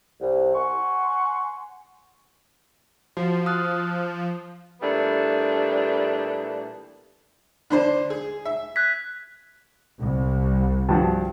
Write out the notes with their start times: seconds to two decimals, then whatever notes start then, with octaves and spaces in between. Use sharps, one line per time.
0.20 C2
0.55 F#5 G#5 C6 C#6
3.17 F3 F#4
3.46 D#6 F6 F#6
4.80 A#2 E3 G3 A3 B3 D4
7.70 D3 D4 C5
8.10 G#4
8.45 E5
8.76 F#6 G#6 B6
9.99 C2
10.89 G2 F3 F#4